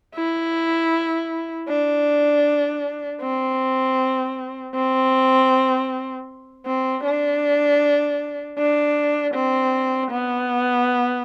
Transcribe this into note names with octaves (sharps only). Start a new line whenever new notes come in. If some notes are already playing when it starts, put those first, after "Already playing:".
E4
D4
C4
C4
C4
D4
D4
C4
B3